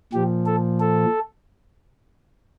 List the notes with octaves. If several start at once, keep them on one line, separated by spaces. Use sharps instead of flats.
A#2 F3 G4
A4
A4